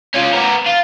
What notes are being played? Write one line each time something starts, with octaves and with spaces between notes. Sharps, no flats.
C#4 F4
B3 A#4
F4